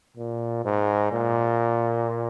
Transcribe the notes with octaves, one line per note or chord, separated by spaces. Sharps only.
A#2
G#2
A#2